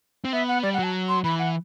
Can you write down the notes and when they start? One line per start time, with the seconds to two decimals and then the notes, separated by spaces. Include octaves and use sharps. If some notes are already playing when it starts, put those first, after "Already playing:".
0.25 C4
0.33 B3 E5
0.48 F#5
0.63 G3 D5
0.74 F#5
0.79 F#3 A5
1.08 C6
1.24 E3 B5
1.39 F#5